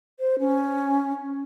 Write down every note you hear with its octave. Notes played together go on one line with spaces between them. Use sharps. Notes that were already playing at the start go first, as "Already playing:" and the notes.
C5
C#4